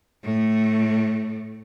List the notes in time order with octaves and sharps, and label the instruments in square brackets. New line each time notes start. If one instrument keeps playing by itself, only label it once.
[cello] A2 A3